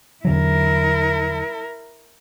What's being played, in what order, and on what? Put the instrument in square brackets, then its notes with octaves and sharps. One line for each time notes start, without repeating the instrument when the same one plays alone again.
[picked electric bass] E2 D3 F#3 [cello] E4 A#4